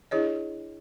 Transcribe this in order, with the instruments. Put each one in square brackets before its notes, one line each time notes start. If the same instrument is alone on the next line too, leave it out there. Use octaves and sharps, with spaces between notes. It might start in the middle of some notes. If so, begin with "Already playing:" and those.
[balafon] D4 E4 G#4 C#5 D#5